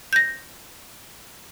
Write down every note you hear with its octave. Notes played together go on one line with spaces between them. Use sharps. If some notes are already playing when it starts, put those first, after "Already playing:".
G6 A#6